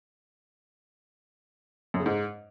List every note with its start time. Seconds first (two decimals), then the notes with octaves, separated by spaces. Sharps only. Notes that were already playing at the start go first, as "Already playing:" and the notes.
1.94 F#2
2.00 C#3
2.06 G#2